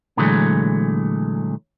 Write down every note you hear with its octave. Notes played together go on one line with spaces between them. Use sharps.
A#2 D3 E3 F#3 G#3 A3